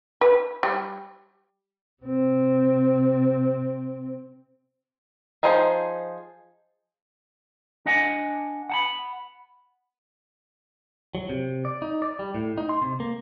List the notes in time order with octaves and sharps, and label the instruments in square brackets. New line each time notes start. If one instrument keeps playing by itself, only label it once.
[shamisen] B4
G3
[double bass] C3 C4
[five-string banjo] F3 D#4 G#4 C5
[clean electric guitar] D4 D#5 F#5 G#5
F#5 A5 B5
F#3
C3
D5
D#4
D5
G3
A2
D#4
C6
C3
A#3